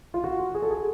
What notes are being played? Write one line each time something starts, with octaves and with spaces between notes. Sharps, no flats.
F4
F#4
G#4
A4
G#4